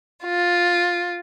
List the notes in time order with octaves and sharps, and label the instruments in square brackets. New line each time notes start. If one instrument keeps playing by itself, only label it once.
[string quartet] F4